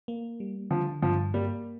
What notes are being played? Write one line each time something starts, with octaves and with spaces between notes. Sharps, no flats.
A#3
G3
D3 F3
G2 F3
G3 A#3